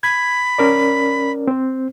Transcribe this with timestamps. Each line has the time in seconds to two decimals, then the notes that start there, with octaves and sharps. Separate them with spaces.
0.03 B5 G#6
0.58 C#4 A#4 D5
1.48 C4 C5